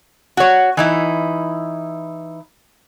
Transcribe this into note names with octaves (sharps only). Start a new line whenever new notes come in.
F#4 C#5
E3 D#4 E4